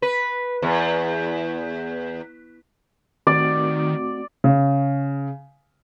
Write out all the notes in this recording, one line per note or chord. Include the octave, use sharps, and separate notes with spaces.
B4
E2
D#3 A3 C4 F#4 D5
C#3